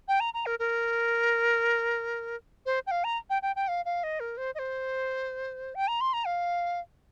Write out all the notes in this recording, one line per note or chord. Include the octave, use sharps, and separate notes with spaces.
G5
A#5
A#5
A#4
A#4
C5
G5
F5
A#5
G5
G5
G5
F5
F5
D#5
A#4
C5
D#5
C5
G5
A#5
C6
A#5
F5